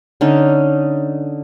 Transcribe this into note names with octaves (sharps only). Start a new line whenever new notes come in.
D3 C#4 D#4